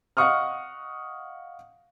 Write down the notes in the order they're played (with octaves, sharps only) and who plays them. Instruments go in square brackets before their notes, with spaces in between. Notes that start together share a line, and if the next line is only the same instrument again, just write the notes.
[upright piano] D#5 F5 F#5 C#6 D#6 F6